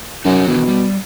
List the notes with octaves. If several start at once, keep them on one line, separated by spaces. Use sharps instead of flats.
F#2 D#4 F#4 C#5
B2 D#3 E3 D4
G3